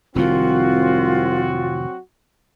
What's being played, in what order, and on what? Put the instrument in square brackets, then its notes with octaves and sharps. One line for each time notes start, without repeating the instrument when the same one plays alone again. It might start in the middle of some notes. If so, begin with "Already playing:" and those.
[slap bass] F1 A2 D#3 [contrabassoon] C2 [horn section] F#3 C4 F#4 [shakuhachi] F4